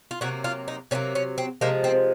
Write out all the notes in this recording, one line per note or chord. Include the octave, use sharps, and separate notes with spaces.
F4
C3 F#3 A#3 F#4
F4
D#4
C3 F#3 A#3 C#4
C#4
C4
C3 F3 G#3 A#3
C4